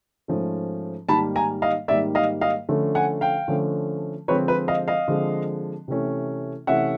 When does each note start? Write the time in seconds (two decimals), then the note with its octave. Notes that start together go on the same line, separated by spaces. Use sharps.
0.28 G#2 F3 A3 C#4
1.08 G#2 D#3 G3 A#3 A5 B5
1.36 G#5 A#5
1.62 D#5 F5
1.88 G#2 D#3 G3 A#3 D5 E5
2.15 D#5 F5
2.41 D#5 F5
2.69 D3 F3 A3 C#4
2.95 F#5 G#5
3.21 F5 G5
3.48 D3 F3 A3 C#4
4.28 D3 F3 G#3 C4 B4 C#5
4.48 B4
4.68 D#5 F5
4.88 D#5 F5
5.08 D3 F3 G#3 C4
5.88 C3 E3 A3 C#4
6.67 C3 E3 A3 C#4 E5 F#5